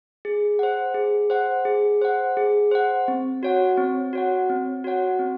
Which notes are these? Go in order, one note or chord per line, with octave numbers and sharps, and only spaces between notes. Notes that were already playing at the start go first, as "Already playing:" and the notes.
G#4
C5 F#5
G#4
C5 F#5
G#4
C5 F#5
G#4
C5 F#5
C4
F#4 C#5 F#5
C4
F#4 C#5 F#5
C4
F#4 C#5 F#5
C4